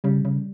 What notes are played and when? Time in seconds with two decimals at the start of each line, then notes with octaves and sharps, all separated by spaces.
0.04 C#3 G3
0.25 C#3